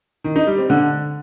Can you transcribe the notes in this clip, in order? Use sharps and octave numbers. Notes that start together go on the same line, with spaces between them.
D#3
D#4
G3
C4
D3